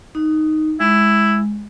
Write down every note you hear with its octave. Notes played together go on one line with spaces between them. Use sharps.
D#4
G#3 E4